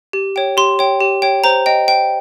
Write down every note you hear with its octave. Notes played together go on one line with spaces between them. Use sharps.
G4
C#5 G5
G4 C6
C#5 G5
G4
C#5 G5
C5 A#5
D#5 G5
C5 G5